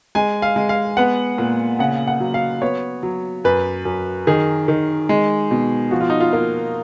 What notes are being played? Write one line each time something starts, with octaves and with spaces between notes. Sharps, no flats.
G#3 G#5
F5
G#3
F5
B3 F#5
A#2
C#3 F#5
F#5
F#3
F5
B3 C#5
F#3
F#2 B4
F#2
D#3 G#4
D#3
G#3
B2
F3 F#4
F4
D#4
F4
A#3 F4